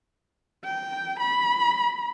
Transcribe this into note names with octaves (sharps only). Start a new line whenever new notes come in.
G5
B5